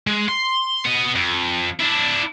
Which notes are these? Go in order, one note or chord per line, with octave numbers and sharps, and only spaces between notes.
G#3
C6
B3 D#5
F2
D4 E4